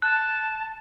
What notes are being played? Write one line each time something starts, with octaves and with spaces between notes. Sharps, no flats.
A5 F#6